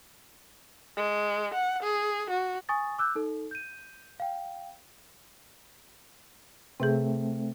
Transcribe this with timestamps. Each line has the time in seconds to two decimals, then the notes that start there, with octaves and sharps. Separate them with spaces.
0.97 G#3
1.54 F#5
1.83 G#4
2.30 F#4
2.69 G#5 C#6 D#6 A6
2.98 D6 E6 F#6 G6
3.15 D#4 A4
3.51 G6 D#7
4.20 F5 G5
6.80 C3 A3 C4 G#4